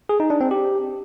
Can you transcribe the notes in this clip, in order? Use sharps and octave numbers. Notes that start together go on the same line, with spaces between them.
G#4
D#4
D4
C4
G4